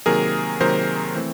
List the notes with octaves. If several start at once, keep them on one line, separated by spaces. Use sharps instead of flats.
C3 D#3 F#3 A#3 G#4 A#4
C3 D#3 F#3 A#3 A#4 C5
E3 A3 C4